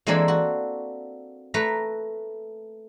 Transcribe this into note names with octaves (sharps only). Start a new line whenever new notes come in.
E3 G#3 A#3 C4 D4 A4
F#4
A3 B4 A#5